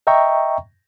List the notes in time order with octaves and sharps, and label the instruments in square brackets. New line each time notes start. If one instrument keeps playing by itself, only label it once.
[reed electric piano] D#5 E5 G5 A#5 C#6